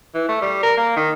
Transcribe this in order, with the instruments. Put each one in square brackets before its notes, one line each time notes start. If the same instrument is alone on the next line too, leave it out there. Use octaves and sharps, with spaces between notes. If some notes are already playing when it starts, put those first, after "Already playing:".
[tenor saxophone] E3
A3
G3
A#4
A#3
D#3